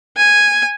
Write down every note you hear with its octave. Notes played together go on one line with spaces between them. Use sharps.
G#5